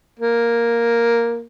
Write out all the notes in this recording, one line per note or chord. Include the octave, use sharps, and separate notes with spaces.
A#3